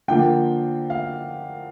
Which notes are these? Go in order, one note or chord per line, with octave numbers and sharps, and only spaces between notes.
D3 F3 A#3 G5
F5